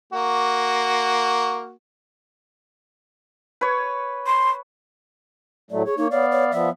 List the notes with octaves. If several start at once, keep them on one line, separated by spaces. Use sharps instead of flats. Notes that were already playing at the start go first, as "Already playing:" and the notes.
A#3 F#4
B4 C#5
C6
A2 F#3 A3 D5
G#4 C#5
A#3 D#4 C#5
B3 C#5 D5 F5
C#5
F3 B3 D5 E5